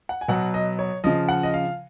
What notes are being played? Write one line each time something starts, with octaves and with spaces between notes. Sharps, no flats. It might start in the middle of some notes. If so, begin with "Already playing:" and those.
F#5
G#5
B2 F#3 F#5
D#5
C#5
C#3 F3 D#5
F#5
D#5
F5